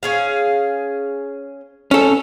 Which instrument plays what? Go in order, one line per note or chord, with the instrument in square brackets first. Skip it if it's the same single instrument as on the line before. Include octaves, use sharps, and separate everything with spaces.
[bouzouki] C#4 G#4 F5
[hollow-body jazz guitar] C#4 A4